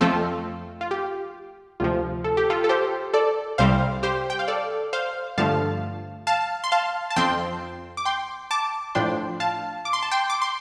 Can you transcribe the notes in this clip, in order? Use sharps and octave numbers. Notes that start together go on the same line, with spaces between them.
F2 F3 A3 C4 F4 A4
F4
G4
D2 C3 F3 F4
A4
G4
F4 A4
A4
G4 C5
A4 D5
C2 C3 G3 C4 C5 F5
G4 C5
G5
F5
A4 D5
C5 F5
G2 D3 F3 A3 F5 A5
F5 A5
C6
F5 A5
A5
F2 F3 C4 G5 C6
D6
G5 C6
A5 D6
A2 F3 D4 G5 C6
F5 A5
D6
C6
A5
G5 C6
D6
C6